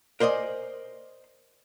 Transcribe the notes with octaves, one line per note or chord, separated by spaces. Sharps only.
A#4 C5 D5 D#5 G#5